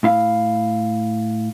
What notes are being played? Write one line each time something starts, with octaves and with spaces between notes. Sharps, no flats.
A2 E4 F5